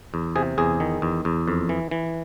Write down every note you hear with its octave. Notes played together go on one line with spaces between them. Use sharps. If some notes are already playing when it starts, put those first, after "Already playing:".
E2
C3 G#4
E2 G#4
D#3
E2
E2
F2
E3
E3